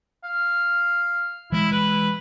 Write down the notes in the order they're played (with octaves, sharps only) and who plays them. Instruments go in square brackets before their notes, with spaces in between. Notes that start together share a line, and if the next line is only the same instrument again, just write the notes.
[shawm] F5
[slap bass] E3 G#3 [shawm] E4
[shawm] B4